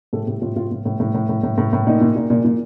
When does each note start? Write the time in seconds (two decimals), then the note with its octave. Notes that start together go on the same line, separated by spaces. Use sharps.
0.13 A2 A4
0.27 A2 G4
0.42 A2 F4
0.56 A2 F4
0.71 A2
0.86 A2
1.00 A2
1.15 A2
1.29 A2
1.43 A2
1.58 A2
1.73 A2
1.87 A#2 D#4
2.01 A#2
2.16 A#2
2.30 A#2
2.45 A#2